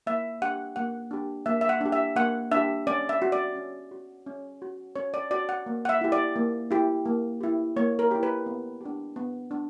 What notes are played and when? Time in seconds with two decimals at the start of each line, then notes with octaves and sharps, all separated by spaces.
0.07 A#3 E5
0.42 D4 G4 F#5
0.76 A#3 F#5
1.11 D4 G4
1.46 A#3 E5
1.61 E5
1.69 F#5
1.81 D4 G4
1.92 E5
2.16 A#3 F#5
2.52 D4 G4 E5
2.87 C#4 D5
3.09 E5
3.22 F#4
3.32 D5
3.56 C#4
3.91 F#4
4.27 C#4
4.62 F#4
4.96 C#4 C#5
5.14 D5
5.31 F#4 D5
5.49 F#5
5.66 A#3
5.85 F#5
5.89 E5
6.01 E4 G4
6.12 D5
6.36 A#3
6.71 E4 G4
7.06 A#3
7.41 E4 G4
7.77 A#3 C#5
7.99 A#4
8.11 E4 G4
8.23 B4
8.46 B3
8.81 D4 G4
9.16 B3
9.51 D4